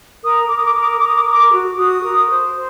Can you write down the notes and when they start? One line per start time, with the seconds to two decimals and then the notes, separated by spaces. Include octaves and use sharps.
0.23 A#4 D#6
0.48 A#4 D6
0.57 D#6
0.65 D6
0.73 A#4 D#6
0.82 D6
0.90 D#6
0.99 A#4 D6
1.06 D#6
1.15 D6
1.23 A#4 D#6
1.32 D6
1.51 F#4
1.77 F#4 D#6
2.02 A#4
2.29 C5
2.54 C5